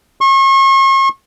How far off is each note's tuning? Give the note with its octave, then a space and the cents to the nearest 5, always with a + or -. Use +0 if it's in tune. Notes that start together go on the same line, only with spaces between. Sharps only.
C#6 -40